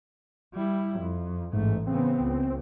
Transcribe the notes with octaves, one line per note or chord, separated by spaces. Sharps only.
G3 E4
F2
A1 G#2 A3
C#3 B3 C4
C#2